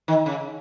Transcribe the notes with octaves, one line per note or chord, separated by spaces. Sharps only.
D#3
C#3